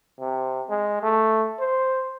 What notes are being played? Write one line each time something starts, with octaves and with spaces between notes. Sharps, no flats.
C3
G#3
A3
C5